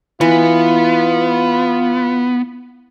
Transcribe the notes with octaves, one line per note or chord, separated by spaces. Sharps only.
E3 B3 F4